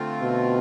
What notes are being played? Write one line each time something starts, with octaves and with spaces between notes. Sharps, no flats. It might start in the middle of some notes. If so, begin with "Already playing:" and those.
Already playing: D3 A3 C4 F4
B2